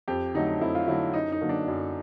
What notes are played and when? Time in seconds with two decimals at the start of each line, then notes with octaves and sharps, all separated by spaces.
0.08 F2 G4
0.34 D3 F#3 A3 D#4
0.61 F2 E4
0.75 F4
0.88 D3 F#3 A3 E4
1.14 F#2 D#4
1.32 D#4
1.41 D3 F#3 A#3
1.49 D4
1.68 F#2